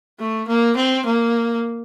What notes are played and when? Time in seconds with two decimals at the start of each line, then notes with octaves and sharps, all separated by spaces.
0.20 A3
0.48 A#3
0.76 C4
1.06 A#3